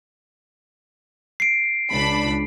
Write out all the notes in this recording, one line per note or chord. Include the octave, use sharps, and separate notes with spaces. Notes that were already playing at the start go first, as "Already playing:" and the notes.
C7 D7
C#2 D4 B5